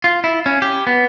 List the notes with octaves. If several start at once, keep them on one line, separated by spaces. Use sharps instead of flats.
F4
E4
C#4
G4
B3